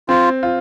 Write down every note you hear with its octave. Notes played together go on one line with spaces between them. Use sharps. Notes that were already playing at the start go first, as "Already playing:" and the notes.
C4 F4
F4